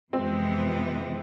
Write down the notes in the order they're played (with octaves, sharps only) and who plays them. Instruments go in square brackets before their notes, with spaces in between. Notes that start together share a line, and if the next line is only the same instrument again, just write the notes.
[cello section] F2 C3 E3 G#3 B3 [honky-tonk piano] C4